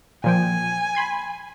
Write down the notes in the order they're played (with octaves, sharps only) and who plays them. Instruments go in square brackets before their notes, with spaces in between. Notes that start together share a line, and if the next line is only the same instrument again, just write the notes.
[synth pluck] A#2 F3 G5 [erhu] G#5
[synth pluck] B5 C6 G#6